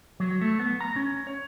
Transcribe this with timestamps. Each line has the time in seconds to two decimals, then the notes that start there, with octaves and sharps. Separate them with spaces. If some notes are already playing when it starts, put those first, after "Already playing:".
0.20 F#3
0.41 A3
0.59 B3
0.81 A#5
0.96 C#4
1.27 C#5